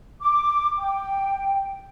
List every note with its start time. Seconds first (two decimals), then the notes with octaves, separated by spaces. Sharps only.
0.21 D6
0.78 G5